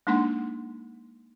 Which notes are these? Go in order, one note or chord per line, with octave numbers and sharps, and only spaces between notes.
G#3 A#3 D4 D#4 F#5 C6